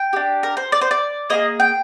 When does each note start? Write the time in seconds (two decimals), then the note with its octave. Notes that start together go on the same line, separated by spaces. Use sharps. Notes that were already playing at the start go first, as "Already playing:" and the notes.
Already playing: G5
0.13 D4 G4
0.43 A#4
0.57 C5
0.72 D5
0.81 C5
0.91 D5
1.30 A#3 F4 G#4 D#5
1.60 G5